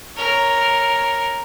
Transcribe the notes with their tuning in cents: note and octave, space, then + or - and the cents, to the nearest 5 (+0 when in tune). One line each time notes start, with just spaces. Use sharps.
A#4 +0 C#5 +0